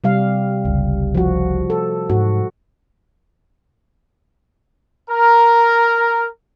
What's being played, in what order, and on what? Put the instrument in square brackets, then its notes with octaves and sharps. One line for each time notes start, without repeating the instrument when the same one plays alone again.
[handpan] C3 G3 F5
[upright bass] G1 C#2
[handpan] F3 F#4
A4
[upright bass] G#2 E3 [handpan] F#4
[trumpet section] A#4